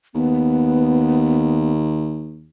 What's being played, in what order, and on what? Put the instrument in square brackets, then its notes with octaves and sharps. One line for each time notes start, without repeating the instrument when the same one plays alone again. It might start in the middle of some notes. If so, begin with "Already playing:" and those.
[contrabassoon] D#2 [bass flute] B3